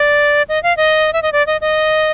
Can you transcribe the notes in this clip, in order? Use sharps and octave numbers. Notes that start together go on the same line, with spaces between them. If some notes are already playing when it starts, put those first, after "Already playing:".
Already playing: D5
D#5
F5
D#5
E5
D#5
D5
D#5
D#5